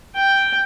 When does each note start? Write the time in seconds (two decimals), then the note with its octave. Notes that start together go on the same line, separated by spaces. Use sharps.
0.16 G5